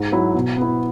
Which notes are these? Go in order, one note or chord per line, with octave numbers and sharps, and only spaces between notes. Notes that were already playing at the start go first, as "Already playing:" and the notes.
Already playing: G#2
F#3 E4
B2
B3 E4